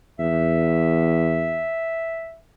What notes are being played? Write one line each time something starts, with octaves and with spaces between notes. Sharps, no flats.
E2 E5